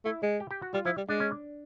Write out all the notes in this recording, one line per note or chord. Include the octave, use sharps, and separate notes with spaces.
A3 E4
G#3
G4
G4
F#4
G3 F4
F3 E4
G3
G#3 D4
C#4
D4